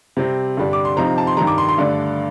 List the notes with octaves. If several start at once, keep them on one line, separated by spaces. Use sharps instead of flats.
C3 G3 C4
G2 D3 G3 D4
D6
C6
C3 F3 C4 D#4 A#5
A5
C6
G2 D#3 G3 A#5
D6
C6
C6
G2 D3 A3 D4 D5